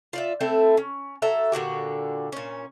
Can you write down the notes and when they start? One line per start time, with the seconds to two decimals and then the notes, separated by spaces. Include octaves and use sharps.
0.13 F4 D5 E5
0.41 A3 C4 E4 A4
0.77 C#4
1.22 F#3 A4 E5 A#5
1.52 A#2 D3 F#4 G4
2.32 A#2 C#4